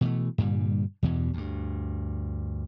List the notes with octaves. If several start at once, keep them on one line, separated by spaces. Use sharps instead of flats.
B2 E3 A3
G2 A#2 D3 G3
E2 G2 B2 E3
D2 G2